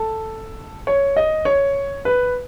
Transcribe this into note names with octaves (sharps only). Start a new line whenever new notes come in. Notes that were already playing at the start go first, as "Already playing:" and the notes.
Already playing: A4
C#5
D#5
C#5
B4